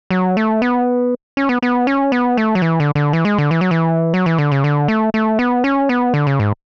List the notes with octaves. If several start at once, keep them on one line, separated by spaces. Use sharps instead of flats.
F#3
A3
B3
C#4
B3
B3
C#4
B3
A3
F#3
E3
D3
D3
E3
G#3
D3
E3
F#3
E3
F#3
E3
D3
C#3
D3
A3
A3
B3
C#4
B3
D3
C#3
G#2